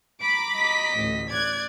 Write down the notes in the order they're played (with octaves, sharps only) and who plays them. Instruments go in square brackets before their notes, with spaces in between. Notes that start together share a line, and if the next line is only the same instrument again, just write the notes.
[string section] A#5 B5 D6 [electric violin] D7
[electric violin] D#5 B6
[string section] A1 D2
[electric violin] D5 [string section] F#6 G#6